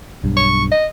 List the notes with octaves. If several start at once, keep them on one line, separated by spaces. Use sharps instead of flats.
B1 G2
C#6
D#5